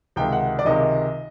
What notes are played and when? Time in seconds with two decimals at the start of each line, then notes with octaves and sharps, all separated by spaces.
0.16 C#2 C3 D#3 G#3 G5
0.32 F#5
0.59 D5
0.65 C#2 C3 D#3 G#3 D#5